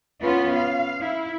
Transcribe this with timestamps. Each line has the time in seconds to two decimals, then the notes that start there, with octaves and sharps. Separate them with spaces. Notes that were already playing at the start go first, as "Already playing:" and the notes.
0.21 B3 C#4 F4
0.55 F5
1.01 E4